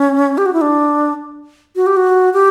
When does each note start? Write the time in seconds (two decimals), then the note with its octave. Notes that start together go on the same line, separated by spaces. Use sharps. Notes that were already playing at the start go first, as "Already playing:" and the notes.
Already playing: C#4
0.38 G4
0.46 F#4
0.53 E4
0.61 D4
1.76 F#4
1.86 G4
1.96 F#4
2.34 G4